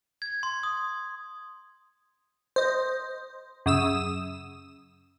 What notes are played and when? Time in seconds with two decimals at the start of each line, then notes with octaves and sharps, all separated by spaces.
0.22 G#6
0.43 C6
0.63 D#6
2.56 C5 D#5
3.66 F#2 C#3 D#6 E6 E7